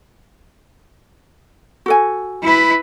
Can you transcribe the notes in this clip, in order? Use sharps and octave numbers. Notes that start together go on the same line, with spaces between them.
F#4 A4 G#5
E4 B4